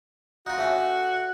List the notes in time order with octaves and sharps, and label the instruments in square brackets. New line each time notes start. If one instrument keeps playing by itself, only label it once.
[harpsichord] D#4 F4 [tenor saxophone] F#4
[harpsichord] A2 A3 C#4